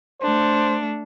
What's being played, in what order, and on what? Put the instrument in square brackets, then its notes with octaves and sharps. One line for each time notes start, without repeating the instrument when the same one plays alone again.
[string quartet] A3 D4 [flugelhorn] C5